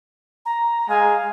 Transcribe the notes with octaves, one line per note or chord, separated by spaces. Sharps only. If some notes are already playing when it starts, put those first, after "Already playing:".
A#5
G#3 G#4 F5 G#5